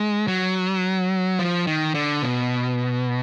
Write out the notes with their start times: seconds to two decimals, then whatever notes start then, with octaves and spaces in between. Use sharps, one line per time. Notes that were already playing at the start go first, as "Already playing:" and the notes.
Already playing: G#3
0.28 F#3
1.39 F3
1.67 D#3
1.94 D3
2.22 B2